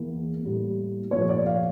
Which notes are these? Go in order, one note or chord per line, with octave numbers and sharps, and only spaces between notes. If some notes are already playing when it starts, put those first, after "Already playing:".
Already playing: E2 E3 A#3
A2 G3 A#3
A#2 F3 A3 C#5
D5
F5